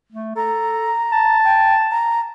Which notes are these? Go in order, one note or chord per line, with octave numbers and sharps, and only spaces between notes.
A3
A4 A#5
A5
G5
A#5